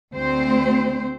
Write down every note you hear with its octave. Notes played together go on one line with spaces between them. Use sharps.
D2 C4 C5